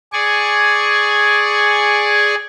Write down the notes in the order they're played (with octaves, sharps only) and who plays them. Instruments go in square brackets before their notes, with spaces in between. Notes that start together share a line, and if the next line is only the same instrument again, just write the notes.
[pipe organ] G#4 D5 G#5 C#6